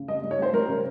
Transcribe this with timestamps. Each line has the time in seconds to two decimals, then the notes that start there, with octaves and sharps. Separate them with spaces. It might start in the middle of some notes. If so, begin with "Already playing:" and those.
Already playing: C#3
0.08 G3 D#5
0.23 G3
0.31 C#5
0.39 G3 C5
0.53 G3 A#4
0.68 C#3